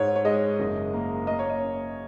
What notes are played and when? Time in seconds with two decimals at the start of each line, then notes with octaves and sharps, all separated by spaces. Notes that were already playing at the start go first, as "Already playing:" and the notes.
Already playing: G#2 C#5
0.16 C#5
0.25 G#3 D#5
0.60 F#1
0.94 A#3
1.27 A#3 D#5
1.39 C#5
1.50 D#5
1.61 C#4